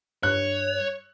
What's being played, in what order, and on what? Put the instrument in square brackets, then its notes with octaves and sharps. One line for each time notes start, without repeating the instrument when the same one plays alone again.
[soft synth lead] G2 [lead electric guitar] C#5 [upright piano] F#6